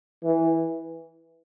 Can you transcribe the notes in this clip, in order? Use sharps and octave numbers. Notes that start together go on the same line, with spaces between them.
E3